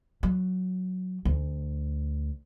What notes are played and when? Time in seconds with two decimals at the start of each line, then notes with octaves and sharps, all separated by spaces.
0.23 F#3
1.25 D2